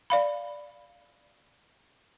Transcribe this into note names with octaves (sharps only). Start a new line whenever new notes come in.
D5 F5 B5